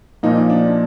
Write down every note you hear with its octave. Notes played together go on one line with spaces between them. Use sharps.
A#2 F3 A#3 D#4
D4